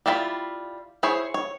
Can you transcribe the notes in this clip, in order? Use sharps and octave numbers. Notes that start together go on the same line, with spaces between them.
G3 E4 F4 A5 B5
E4 G#4 C5 C#5
C#5